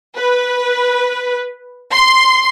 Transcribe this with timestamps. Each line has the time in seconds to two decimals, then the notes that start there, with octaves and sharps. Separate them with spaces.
0.17 B4
1.93 C6